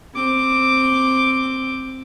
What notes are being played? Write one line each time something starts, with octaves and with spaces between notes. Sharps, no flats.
C4 D6